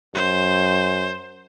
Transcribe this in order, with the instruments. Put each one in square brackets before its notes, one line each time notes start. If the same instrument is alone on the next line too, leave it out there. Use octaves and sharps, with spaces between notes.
[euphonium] F#2 [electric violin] C5